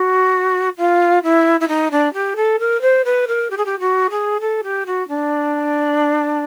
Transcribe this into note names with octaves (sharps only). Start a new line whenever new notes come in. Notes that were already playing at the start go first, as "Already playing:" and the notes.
Already playing: F#4
F4
E4
E4
D#4
D4
G4
A4
A#4
C5
B4
A#4
G4
G#4
G4
F#4
G#4
A4
G4
F#4
D4